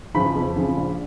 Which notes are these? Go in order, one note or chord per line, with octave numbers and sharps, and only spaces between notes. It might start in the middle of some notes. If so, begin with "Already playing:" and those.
C#3 F3 B5
F2
C#3 F3
A#1